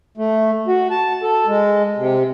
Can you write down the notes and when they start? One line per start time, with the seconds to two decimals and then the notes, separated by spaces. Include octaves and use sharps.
0.18 A3
0.67 F#4
0.91 A5
1.23 A4
1.47 G#3
1.97 C3